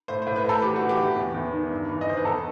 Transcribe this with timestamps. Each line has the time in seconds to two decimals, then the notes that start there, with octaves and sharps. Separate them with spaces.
0.08 A2 C5
0.22 C5
0.26 A2
0.36 B4
0.44 A2 A4
0.62 E3 G4
0.76 F#4
0.81 E3
0.89 G4
0.99 E3
1.16 E2
1.34 E2
1.52 D#3
1.71 G2
1.89 E3
2.01 D#5
2.07 E3 C5
2.17 B4
2.24 E2 A4